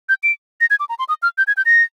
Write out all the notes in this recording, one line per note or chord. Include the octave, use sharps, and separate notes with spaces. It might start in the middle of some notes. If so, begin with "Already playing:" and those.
G6
D7
A#6
G#6
D6
A#5
C6
D#6
F6
G6
G#6
G6
A#6